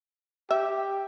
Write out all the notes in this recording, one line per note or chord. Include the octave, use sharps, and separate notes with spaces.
G4 E5